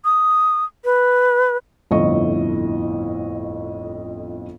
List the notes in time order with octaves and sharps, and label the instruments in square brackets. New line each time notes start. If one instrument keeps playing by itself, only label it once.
[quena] D#6
B4
[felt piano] G1 F2 A2 E4 D#5 C#6